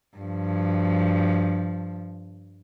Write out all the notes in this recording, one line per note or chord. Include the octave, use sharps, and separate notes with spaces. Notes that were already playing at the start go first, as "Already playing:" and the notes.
G2 F3